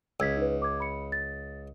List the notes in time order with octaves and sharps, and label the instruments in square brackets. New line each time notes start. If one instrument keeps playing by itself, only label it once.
[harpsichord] C#2 [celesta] E6 G#6 B6
[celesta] D#4 B4
D6 G#6
B5 C#7
A6